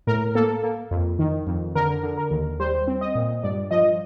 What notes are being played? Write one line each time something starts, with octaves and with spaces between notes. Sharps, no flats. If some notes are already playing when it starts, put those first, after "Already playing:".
A2 A#4
A#3 A4
A#3
F2
D#3
F2
D3 A#4
D3
A#4
D#2
G3 C5
C4
D#5
A#2
G2 D5
F3 D#5